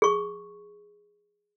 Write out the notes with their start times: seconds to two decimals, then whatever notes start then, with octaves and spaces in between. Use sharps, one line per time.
0.02 G#4 C#6